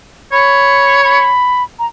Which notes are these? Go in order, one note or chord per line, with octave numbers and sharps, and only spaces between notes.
C#5 B5
B5
A#5